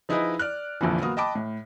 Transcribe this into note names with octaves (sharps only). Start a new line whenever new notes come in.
F3 D#4 E4 G#4 B4 D#5
D5 F6 F#6
A#1 F2 A#2 D3 E3
F#3 A#3 B3 F#4 D#6
D#5 G5 A5 B5 D6
A2